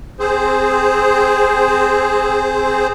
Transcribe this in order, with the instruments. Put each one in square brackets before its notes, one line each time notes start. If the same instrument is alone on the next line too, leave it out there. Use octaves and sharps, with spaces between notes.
[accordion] C4 G#4 C5